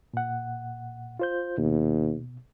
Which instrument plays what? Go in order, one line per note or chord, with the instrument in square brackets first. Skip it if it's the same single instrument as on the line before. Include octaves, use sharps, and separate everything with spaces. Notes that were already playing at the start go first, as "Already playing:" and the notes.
[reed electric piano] A#2 F#5
F4 C5 G6
[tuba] D#2 [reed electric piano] B2